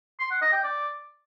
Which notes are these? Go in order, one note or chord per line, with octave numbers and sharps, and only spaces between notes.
C6
F#5
D#5
G5
D5